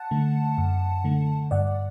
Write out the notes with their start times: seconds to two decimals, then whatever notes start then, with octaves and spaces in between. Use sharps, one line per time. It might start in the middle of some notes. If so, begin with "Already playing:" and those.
Already playing: F#5 A5
0.11 D3 A3
0.58 F#2
1.04 D3 A3
1.51 G2 D5 F#5